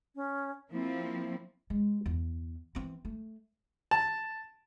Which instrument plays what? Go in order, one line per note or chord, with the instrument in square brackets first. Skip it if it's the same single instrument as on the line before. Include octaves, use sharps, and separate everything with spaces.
[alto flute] C#4
[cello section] F3 A#3 C4 [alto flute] E4
[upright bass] G#3
E2
E3 C4
A3
[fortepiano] A5